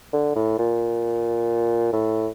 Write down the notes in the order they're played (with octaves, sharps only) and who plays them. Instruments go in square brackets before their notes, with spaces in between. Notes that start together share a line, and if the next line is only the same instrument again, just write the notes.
[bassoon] D3
A2
A#2
A2